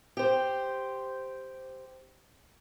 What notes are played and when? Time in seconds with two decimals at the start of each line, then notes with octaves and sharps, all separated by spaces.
0.17 G4 C5